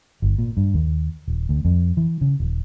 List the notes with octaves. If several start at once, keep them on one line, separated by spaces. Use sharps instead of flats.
G1
A#2
G2
D#2
D#1
D2
F2
E3
C#3
D#1